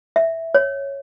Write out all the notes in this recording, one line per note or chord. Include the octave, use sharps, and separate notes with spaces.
E5
C#5